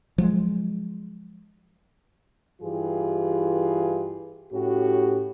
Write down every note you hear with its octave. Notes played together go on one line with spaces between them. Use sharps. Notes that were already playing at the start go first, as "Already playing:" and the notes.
F3 F#3 G#3
G2 E3 F4 G4 G#4
A2 C#4 F#4 G4